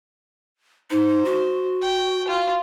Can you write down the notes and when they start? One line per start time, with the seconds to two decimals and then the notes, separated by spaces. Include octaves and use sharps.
0.90 D#4 C5
1.25 F#4
1.81 G5
2.28 F4